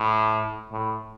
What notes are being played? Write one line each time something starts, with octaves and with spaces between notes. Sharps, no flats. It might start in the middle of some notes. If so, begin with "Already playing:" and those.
Already playing: A2
A2